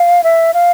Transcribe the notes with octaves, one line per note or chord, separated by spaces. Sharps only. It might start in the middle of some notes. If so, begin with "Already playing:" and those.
Already playing: F5
E5
F5